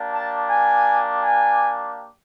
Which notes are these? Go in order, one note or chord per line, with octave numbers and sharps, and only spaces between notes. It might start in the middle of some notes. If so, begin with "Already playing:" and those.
Already playing: A#3 D4 G4
A5
G#5
G#5